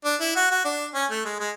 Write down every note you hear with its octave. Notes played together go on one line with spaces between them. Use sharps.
D4
E4
F#4
F#4
D4
C#4
A3
G#3
G#3